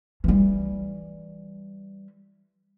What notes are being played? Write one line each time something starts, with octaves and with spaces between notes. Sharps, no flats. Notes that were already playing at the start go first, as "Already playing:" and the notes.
E3 G3